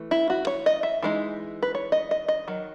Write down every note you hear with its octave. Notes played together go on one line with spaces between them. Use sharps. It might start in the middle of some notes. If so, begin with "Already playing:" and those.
Already playing: E3 A3
E4
F#4
C#5
D#5
E5
E3 G#3 D#4
B4
C#5
D#5
D#5
D#5
D#3 F#3